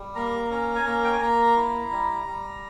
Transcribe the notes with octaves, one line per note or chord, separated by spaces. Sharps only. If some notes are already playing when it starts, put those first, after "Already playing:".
Already playing: G3
A#3 A#5
C#4 A#5
G#5
A#3 A#5
G5
G#5
A#3 A#5
E4
G3
G3